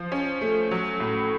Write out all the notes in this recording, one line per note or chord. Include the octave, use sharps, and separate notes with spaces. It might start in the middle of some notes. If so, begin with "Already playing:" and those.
Already playing: F3
C#4
A3
F#3
A2